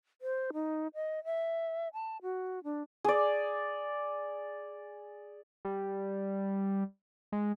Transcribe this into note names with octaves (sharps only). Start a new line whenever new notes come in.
C5
D#4
D#5
E5
A5
F#4
D4
G#4 D5
G3
G#3